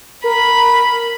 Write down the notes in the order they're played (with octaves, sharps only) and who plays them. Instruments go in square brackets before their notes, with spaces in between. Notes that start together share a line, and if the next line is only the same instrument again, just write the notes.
[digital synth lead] A#4 [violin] B5